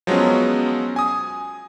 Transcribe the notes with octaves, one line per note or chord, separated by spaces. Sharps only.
F3 F#3 G#3 B3 C#4
G#5 D#6